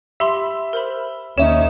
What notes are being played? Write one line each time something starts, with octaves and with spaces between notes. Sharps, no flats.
G4 E5 B5 C6
A#4 C5 B5
D#2 C#4 D#4 E5 E7